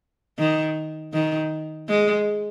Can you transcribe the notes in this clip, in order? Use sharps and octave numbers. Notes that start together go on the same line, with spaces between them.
D#3
D#3
G#3